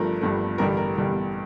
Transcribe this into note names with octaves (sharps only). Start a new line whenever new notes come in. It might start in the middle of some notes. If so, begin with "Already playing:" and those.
Already playing: G1 G2 F3 A3 A#4
G1 G2 F3 A3
A1 G2 D3 G3 A#4
A#4
A1 G2 D3 G3